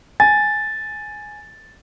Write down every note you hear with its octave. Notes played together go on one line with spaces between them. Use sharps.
G#5 A6